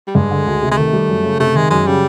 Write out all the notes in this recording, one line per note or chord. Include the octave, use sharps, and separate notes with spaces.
G3
G2 G#3
D3
D2
C3
G#3
D#3 A3
G3
F#2
C#3
C3 A3
D#3 G#3
F#2 G#3
C#3 G3